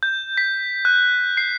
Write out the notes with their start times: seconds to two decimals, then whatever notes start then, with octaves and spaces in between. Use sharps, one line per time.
0.03 G6
0.38 B6
0.85 F#6
1.37 C7